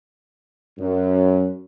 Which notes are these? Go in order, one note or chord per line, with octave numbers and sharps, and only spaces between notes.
F#2